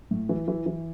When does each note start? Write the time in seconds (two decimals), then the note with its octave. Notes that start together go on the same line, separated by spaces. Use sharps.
0.11 A2
0.29 E3
0.48 E3
0.66 E3